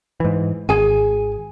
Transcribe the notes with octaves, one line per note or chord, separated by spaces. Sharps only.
G#2 E3
G#1 G#4 G#5